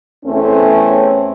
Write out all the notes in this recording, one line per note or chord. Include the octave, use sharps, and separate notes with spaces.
E2 A3 C4 C#4